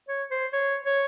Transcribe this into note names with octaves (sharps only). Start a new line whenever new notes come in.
C#5
C5
C#5
C#5